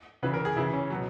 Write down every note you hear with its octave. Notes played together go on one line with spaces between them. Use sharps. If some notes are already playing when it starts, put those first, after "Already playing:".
C#3 E3 B4
A#4
G#4
C#3 E3 E4
C#4
B2 F#3